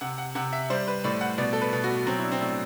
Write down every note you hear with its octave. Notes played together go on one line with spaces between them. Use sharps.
C3 F#5
F#5
C3 F#5
E5
G3 C5
B4
A2 D5
F#5
B2 D5
A4
B4
B2
F#4
F#3 C4
E4
D4
C4
A2 D4